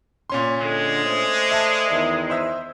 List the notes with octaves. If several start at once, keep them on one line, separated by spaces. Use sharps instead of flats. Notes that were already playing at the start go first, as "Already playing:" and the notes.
A#2 C#4 C6
D3 G#3
A3 C5 D5
E5 A5
E2 D#3 E5
C5 E5 E6